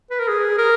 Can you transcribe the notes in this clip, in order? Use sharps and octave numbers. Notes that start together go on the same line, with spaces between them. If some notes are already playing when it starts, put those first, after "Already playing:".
B4
A#4
G#4
A#4